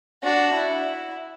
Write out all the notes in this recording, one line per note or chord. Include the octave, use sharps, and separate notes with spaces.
D4 F#4
E4